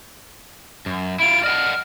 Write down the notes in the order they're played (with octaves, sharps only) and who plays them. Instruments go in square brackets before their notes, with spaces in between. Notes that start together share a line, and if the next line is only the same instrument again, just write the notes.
[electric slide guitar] F#2
[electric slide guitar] E4 F4 [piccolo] D7
[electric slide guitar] D5 D#5 F#5 [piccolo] F6